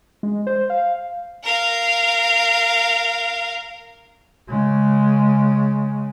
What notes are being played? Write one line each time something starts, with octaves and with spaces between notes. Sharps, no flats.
G#3
C5
F5
A#4 F5
C#3 G#3